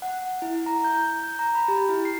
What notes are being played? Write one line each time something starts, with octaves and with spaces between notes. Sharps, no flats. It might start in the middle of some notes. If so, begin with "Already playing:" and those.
F#5
E4
A#5
G6
G6
A#5
B5
G4
E4
C7